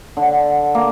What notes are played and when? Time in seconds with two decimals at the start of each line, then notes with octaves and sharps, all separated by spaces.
0.17 D3
0.75 A#3